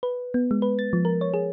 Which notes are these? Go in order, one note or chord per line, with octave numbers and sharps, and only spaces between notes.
B4
B3
G#3
B4
A6
F3
A#4
C#5
G#4